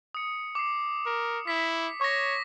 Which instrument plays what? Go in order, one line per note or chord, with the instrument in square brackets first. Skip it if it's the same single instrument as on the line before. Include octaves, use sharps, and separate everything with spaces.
[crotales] D#6 C#7
D6 C7
[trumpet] A#4
[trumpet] E4 [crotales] B6
[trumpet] C#5 [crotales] C#6 A#6